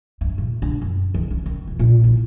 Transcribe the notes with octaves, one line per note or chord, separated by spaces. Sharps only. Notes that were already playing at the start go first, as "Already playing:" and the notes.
G2
A#2
D4
F#2
D#3
C#4
D#3
D#1
A#2
E4